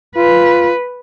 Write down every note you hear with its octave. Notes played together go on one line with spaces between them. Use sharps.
F4 B4